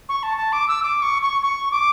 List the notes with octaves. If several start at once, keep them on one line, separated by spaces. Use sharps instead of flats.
C#6
A5
A5
D6
E6
D6
C#6
C#6
C#6
D6